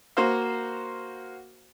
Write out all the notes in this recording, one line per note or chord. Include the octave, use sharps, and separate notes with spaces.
A#3 F#4 C5 F5